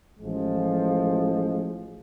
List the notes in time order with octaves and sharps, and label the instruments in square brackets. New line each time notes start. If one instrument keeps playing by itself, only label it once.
[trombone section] A1 F3 G#3